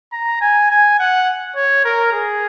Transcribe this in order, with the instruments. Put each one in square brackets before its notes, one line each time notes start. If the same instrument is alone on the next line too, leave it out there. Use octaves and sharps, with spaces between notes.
[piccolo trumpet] A#5
G#5
G#5
F#5
C#5
A#4
G#4